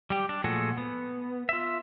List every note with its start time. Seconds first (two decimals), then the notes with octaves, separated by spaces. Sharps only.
0.10 G3 G4
0.29 D4
0.44 A#2 F3 A3 F#4 G#4 A4
0.78 B3
1.49 F4 E5